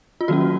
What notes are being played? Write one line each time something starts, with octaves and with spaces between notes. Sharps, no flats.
F4
D#3 F#3 A#3 C#4 F#4